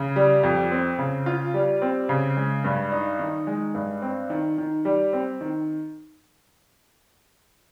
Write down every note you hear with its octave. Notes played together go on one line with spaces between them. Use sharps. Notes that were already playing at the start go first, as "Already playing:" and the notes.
Already playing: C#3
G3
F2
C4
C#3
F4
G3
C4
C#3
G#3
G2
D#4
D#3
G#3
G2
C4
D#3
D#3
G3
C4
D#3